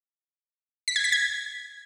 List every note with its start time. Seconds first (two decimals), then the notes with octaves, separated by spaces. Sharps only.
0.88 B6
0.96 G#6
1.04 B6
1.12 G#6